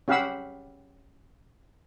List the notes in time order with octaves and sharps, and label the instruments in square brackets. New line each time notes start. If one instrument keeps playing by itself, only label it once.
[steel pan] C#4 G4 F5 F#5 B5 E6